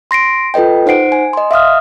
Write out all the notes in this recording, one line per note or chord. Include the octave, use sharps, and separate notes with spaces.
C6 A#6 C7 D7
F4 A4 B4 D#5 G5
D#4 C5 F#5 C7 D7
G#5
D#5 C6
E5 F5 D#6 F6